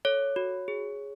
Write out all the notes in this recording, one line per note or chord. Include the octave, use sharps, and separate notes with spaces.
A4 C#5
F#4
G#4